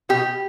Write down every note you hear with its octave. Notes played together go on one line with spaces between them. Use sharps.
B2 G4